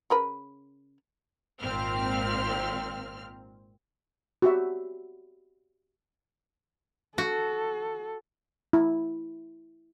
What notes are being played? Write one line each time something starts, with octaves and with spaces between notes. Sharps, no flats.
C#3 A#4 B4
G#1 A#2 C4 F6
F#4 G4 E5
F#4 A4
E4